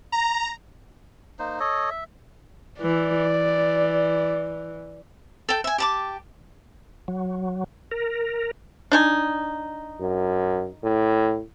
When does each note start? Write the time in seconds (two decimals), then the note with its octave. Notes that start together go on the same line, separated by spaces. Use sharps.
0.12 A#5
1.39 A#3 D#4 C5
1.60 A4 C#5 D#5
1.90 E5
2.82 E3 D5
3.29 E3
5.49 A4 G5
5.64 E5 G#5
5.78 G4 A5 D6
7.08 F#3
7.91 A#4
8.92 D4 D#4 G#5
10.01 F#2
10.84 A2